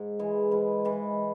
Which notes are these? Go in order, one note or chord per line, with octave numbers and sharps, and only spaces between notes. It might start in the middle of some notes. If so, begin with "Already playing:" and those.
Already playing: G#2
E3 G#3
G#2 B4
E3 G#3